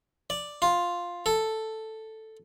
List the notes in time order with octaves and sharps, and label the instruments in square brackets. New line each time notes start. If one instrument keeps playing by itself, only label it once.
[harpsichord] D5
F4
A4